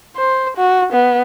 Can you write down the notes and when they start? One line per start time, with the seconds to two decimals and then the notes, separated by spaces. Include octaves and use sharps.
0.17 C5
0.57 F#4
0.92 B3